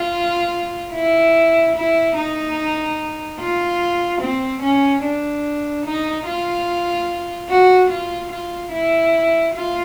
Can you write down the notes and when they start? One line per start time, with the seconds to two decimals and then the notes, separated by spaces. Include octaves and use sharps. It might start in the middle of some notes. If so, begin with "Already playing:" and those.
Already playing: F4
0.93 E4
1.75 E4
2.16 D#4
3.39 F4
4.21 C4
4.62 C#4
5.03 D4
5.85 D#4
6.26 F4
7.49 F#4
7.90 F4
8.32 F4
8.72 E4
9.54 F4